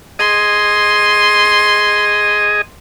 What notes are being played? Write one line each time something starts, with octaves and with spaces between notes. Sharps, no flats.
G#4 D#5 C6